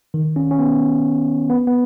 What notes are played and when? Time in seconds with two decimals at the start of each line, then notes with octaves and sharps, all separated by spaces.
0.14 D#3
0.36 C#4
0.51 C#4
0.59 B3
1.50 B3
1.67 B3